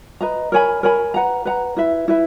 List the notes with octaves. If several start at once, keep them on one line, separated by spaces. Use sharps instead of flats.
B4 D#5 A#5
A#4 C#5 G#5 B5
A#4 C#5 G#5 B5
B4 F#5 A#5
B4 F#5 A#5
E4 B4 E5
E4 B4 E5